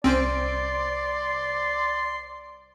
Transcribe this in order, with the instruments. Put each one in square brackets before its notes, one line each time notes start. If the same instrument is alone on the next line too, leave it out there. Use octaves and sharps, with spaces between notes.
[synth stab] C2 C5 D7 [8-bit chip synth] C4 C#4 [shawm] D5 [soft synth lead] C6